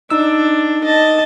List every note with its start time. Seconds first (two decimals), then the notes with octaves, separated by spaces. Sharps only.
0.10 D4 D#4 E6
0.84 D#5 A5